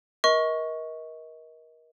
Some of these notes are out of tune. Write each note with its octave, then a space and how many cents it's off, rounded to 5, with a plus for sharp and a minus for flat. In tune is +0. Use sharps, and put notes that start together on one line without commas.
A#4 +30 D#5 +30 C#6 +0